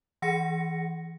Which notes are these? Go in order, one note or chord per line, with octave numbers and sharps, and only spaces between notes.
E3 G#4 F#5 A#6 C#7